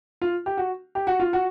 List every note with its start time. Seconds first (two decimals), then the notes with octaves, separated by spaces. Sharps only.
0.22 F4
0.46 G4
0.57 F#4
0.95 G4
1.07 F#4
1.20 F4
1.33 F#4